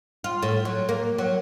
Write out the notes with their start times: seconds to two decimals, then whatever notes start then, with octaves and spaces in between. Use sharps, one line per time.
0.24 F4
0.43 A2
0.65 F#3
0.89 A#3
1.18 F#3